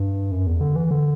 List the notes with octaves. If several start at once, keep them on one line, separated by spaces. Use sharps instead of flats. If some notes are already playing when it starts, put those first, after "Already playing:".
Already playing: G2
F#2
E2
D3
E3
D3